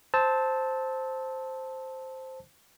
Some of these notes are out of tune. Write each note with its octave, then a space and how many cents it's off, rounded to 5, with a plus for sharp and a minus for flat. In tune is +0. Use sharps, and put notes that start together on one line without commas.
C5 +0 A5 +0 E6 -30